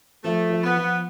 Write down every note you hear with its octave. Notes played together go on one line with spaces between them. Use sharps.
F3 A3
F3
B3
F3